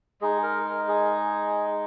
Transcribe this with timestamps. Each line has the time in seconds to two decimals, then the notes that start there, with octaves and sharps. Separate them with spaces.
0.21 G#3 D#4 G#4
0.43 A#4
0.65 A#4
0.88 G#4